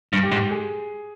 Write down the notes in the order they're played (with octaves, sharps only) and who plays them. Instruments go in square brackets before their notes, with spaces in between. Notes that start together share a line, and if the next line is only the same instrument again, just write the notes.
[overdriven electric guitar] G2
[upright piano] G4
[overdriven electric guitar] G#2
[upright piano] G#4